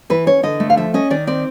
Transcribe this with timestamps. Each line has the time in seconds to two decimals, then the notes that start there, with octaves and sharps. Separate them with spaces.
0.10 E3 B4
0.26 C#4 C#5
0.43 D3 D#5
0.60 A3
0.70 F5
0.77 F3 E5
0.94 C#4 D#5
1.10 D#3 D5
1.27 C4 D5